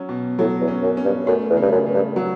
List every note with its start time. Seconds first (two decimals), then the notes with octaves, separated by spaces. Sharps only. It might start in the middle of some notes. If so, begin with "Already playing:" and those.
Already playing: F#3 C#4
0.09 B2
0.39 A2 F#3
0.60 E2
0.68 C#4
0.82 F#2
0.97 C#4
1.05 G2
1.27 F#2 A3
1.50 E2
1.57 G2 C#3
1.72 F#2
1.86 C#3
1.94 G2
2.16 F#3